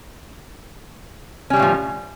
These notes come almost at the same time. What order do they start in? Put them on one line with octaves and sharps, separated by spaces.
C#4 G3 D3 A2 F3